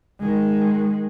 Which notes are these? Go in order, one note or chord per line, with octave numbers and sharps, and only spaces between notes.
D#3 G#3